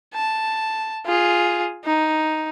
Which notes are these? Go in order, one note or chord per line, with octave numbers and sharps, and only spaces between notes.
A5
F4 G#4
D#4